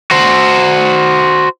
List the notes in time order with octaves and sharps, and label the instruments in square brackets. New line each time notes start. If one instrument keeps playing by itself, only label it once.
[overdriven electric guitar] F#4 C5